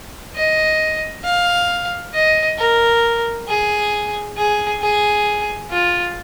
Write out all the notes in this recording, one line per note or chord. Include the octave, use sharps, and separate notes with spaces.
D#5
F5
D#5
A#4
G#4
G#4
G#4
F4